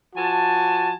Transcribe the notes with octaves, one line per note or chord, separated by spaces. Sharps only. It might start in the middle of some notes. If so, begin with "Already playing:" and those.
F3 F#4 G#5 A5